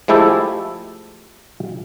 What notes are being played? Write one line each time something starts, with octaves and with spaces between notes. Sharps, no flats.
F3 G#3 A3 E4 G4 A4